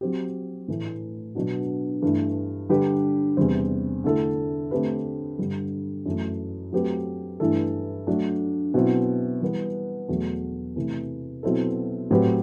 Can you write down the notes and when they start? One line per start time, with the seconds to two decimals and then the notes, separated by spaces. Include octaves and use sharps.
0.01 F#3 C4 G4
0.68 A2 E3 A3
1.35 B2 F#3 B3 D4 F#4
2.02 G2 E3 A3
2.69 D3 G3 D4 G4 B4
3.37 E2 C3 G3 C4
4.04 D3 A3 E4 A4
4.71 D3 A3 C4 G4 B4
5.38 G2 D3 G3
6.06 F#2 E3 A3
6.73 F#3 A3 C4 G4 B4
7.40 G2 E3 A3 E4 A4
8.07 F#3 A3 D4
8.74 B2 F#3 C4 E4
9.42 E3 G3 B3
10.09 E2 B2 F#3 A3
10.76 C3 E3 A3
11.43 B2 F#3 C4 E4 A4
12.11 A2 F#3 C4 G4 B4